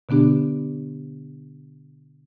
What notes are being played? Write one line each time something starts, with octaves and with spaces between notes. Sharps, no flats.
B2 D3 B3 D4 G4